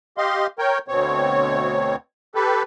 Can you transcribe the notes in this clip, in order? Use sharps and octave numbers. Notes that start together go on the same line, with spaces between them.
G4 D#5 F5 C6
A#4 C#5 G5
D2 B2 C4 C#5
G4 A4 B4